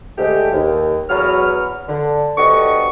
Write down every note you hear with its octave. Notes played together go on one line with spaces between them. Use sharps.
D2 G#3 A3 G4
D#2
E2 F#3 B3 C#5 B5 F6
D3
D2 D3 B3 G4 D#5 C#6